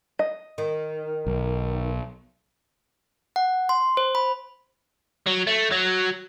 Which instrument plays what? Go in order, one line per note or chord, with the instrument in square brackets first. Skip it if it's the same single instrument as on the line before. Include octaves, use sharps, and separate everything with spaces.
[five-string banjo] D#5
[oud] D#3
[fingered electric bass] B1
[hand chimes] F#5
C6
C5
B5
[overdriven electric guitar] F#3
A3
F#3